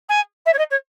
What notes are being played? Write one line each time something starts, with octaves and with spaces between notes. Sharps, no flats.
G#5
E5
C#5
D#5
C#5